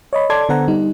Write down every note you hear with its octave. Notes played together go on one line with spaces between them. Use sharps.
C#5 D#5 B5
A4 D5 A5 C6 D6 G#6
D3 B3 A4 C5 F#5 A#5
G3 D#4